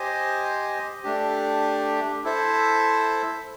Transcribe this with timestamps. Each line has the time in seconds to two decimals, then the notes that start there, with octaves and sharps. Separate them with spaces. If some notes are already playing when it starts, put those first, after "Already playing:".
Already playing: G4 C5 D#5 G#5
1.03 A3 D4 G4
2.24 E4 A4 C5 E5